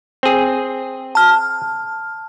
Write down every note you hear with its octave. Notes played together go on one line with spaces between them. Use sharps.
C4 G#4
A5 F6